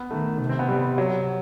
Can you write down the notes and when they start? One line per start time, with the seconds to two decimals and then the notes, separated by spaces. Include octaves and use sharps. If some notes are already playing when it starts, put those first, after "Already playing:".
Already playing: B3
0.11 D#3 A3
0.39 C3
0.49 C4
0.59 B3
0.69 G3
0.98 F#3